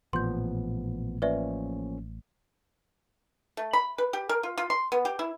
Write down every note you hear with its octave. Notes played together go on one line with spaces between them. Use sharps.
A1 A#2 F3 B3 C6 G6
F3 A#3 C#4 B4 D5 E5
A3
B5
B4
G4
A#4
F4
F4
C6
B3
G4
E4